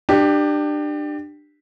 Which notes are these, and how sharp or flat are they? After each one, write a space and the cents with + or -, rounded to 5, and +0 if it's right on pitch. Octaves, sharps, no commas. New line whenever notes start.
D4 +25 G4 +0